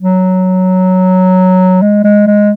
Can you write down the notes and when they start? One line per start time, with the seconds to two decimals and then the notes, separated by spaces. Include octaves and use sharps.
0.01 F#3
1.82 G#3
2.04 G#3
2.27 G#3